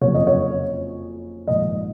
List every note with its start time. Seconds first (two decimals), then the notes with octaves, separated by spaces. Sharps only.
0.01 F#1 F2 C#3 F3 C#5
0.14 D#5
0.27 C#5
1.47 A#1 G#2 D#3 D#5